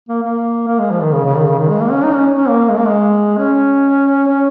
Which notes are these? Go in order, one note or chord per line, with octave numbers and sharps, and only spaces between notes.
A#3
A#3
A#3
G#3
F3
D#3
C#3
C#3
D#3
C#3
D#3
G#3
A#3
C#4
D#4
C#4
C#4
A#3
G#3
A#3
G#3
C#4
C#4